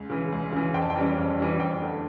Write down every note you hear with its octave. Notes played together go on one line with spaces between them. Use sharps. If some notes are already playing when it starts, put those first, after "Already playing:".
Already playing: C#2
C#3 E3
C#2
C#3 E3
F2 G5
A5
G5
E3 G3 C#4
F2
E3 G3 C#4
F2 G5
D3 A3